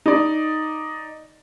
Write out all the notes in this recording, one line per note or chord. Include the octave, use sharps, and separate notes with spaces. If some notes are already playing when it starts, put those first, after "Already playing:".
D#4 D5